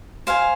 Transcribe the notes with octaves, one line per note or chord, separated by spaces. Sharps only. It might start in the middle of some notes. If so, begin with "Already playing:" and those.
C5 F5 G#5